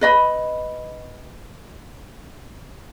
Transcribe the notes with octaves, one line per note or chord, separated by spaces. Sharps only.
B4 D#5 B5